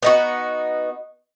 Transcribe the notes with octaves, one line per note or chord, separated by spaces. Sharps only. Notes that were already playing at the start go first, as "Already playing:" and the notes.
B3 D#4 F#4